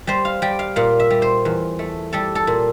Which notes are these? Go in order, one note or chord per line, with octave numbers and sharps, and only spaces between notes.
G3 C5
F5
G3 G5
F5
A#2 F5
E5
G3
C5
E2
A3
G3 A4
A4
A#2